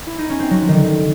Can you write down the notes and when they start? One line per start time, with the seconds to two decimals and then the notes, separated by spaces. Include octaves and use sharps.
0.07 E4
0.18 D#4
0.30 C#4
0.40 C4
0.51 F#3
0.62 F3
0.68 D3 D#3
0.84 D#3